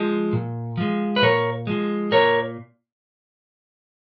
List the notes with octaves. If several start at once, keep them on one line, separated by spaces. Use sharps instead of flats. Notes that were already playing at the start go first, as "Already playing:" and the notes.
Already playing: F3 G#3
A#2
F3 G#3
B4
A#2 A#4 C#5
F3 G#3
A#2 A#4 C#5